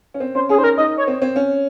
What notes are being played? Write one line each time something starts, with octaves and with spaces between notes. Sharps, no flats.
C#4
C4
C#4 C5
C#4 G#4
D#4 C5
C#4 A#4
D#4 D#5
C#5
C4
C4
C#4